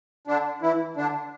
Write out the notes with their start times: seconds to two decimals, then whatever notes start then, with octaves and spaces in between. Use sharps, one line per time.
0.27 D3 D4
0.62 E3 E4
0.96 D3 D4